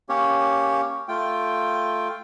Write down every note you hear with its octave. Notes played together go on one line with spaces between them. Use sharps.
A#3 C#4 G4 C#5
A3 F4 G5